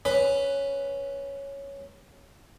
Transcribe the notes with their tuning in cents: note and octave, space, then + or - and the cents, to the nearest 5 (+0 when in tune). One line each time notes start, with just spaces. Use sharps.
C#4 +0 B4 +0